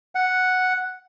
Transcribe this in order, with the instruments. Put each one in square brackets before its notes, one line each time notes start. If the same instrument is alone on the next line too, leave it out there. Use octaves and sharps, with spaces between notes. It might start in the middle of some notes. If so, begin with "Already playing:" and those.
[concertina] F#5